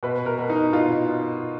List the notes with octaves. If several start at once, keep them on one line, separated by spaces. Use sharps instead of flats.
B2 B4
A#4
B2
D#4
B2 F4